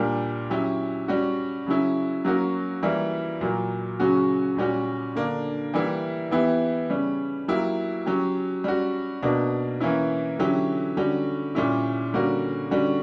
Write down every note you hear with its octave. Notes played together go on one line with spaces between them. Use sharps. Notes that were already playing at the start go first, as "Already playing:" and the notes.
Already playing: A#2 G3 A#3 D4 G4
F#3 C#4 E4 G4
G3 C#4 F#4
C#3 F#3 C#4 E4
F#3 A#3 C#4 F#4
E3 G3 A#3 E4
A#2 F#3 A#3
C#3 F#3 C#4 F#4
A#2 G3 C#4 F#4
D3 A#3 D4
E3 G3 A#3 E4 G4
E3 B3 E4 G4
C#3 G3 C#4
F#3 A#3 E4 G4
F#3 C#4 G4
G3 C#4 F#4
B2 A#3 D4
E3 A#3 C#4 E4
D3 F#3 C#4 E4 G4
D3 G3 C#4 F#4
A#2 G3 C#4 E4
D3 G3 A#3 C#4 F#4
D3 G3 C#4 F#4